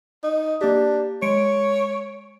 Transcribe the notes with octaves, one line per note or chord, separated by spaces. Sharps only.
D#4
A#3 D4 G4
G#3 C#5 C#7 D7